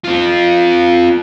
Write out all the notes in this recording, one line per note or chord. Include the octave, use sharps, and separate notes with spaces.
C4 F4